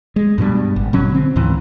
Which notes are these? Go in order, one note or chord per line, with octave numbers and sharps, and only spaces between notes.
G#3
G2 B2 F#3 G3
G#1
B2 F#3 C#4
D3 C4
C#2 G#2 E3